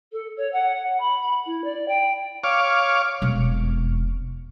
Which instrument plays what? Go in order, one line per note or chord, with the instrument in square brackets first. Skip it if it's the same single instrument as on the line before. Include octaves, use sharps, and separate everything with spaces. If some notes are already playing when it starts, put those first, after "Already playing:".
[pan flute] A4
C#5
F#5
B5
E4
D5
G5
[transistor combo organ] C#5 F5 D6
[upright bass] E1 F2